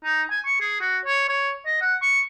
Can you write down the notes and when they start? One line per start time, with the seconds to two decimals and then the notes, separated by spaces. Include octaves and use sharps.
0.04 D#4
0.31 G#5
0.46 C#6
0.60 G#4
0.81 F#4
1.05 C#5
1.29 C#5
1.66 D#5
1.81 F#5
2.02 C#6